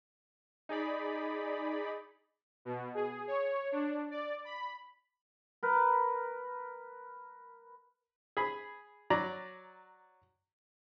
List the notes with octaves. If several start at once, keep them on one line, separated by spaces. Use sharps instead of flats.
D#4 G#4 D5 B5
B2
G#4
C#5
D4
D5
B5
A#4 B4
G#4 B5
F#3 D5 A#5